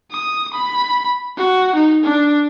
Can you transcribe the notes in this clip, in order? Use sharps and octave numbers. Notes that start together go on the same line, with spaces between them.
D#6
B5
F#4
D#4
D4